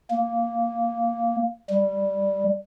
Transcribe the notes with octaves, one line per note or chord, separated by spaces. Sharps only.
A#3
G3